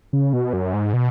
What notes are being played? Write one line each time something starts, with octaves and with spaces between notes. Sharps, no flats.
C#3
B2
F#2
G#2
B2